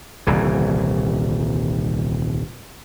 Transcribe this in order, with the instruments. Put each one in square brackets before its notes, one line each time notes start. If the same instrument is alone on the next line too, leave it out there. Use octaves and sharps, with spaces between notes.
[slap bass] D#1 C2 C#3 E3